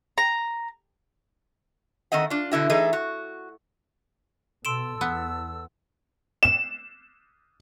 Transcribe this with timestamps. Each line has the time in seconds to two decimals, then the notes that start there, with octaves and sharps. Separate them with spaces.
0.18 A#5
2.12 D#3 A3 C4 D#5 F#5
2.30 D4 F4
2.52 B2 D3 E4 F#4
2.70 E3 A3 D#4 G#4 D#5
2.93 F#4
4.65 B2 A4 C6 E6 D7 E7
5.01 E2 B3
6.43 E7